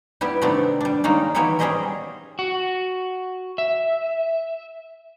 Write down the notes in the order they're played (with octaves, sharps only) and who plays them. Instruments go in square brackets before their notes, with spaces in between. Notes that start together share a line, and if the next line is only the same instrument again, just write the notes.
[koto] G3 B3 E4 G4
C3 D#3 A3 B3 C4 D4
G3 D4
D#3 G#3 A#3 C#4 D#4
D#3 E3 A#3 B3 E4 C#5
G3 C#4 G#4 C5 D#5 E5
[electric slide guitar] F#4
E5